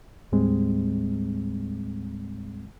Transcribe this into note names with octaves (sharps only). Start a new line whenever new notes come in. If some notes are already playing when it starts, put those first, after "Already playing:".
D#2 A2 G3 G#3 C4